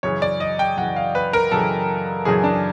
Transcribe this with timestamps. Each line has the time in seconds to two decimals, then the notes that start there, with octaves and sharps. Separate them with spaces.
0.03 F#2 C#3 E3 C#5
0.22 D5
0.40 D#5
0.59 G5
0.77 F#2 C#3 E3 F#5
0.96 F5
1.15 B4
1.33 A#4
1.51 F#2 C#3 E3 A4
2.25 F#2 C#3 E3 G#4
2.44 D4